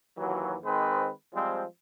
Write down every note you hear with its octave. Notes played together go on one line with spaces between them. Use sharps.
D#2 E3 F#3
D#3 G#3 C4 B4 C5
F3 G3 G#3 C4